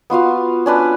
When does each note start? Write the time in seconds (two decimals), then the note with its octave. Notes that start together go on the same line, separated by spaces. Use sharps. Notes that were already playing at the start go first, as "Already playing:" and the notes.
0.10 B3 F4 F#4 F5
0.66 C#4 D4 B4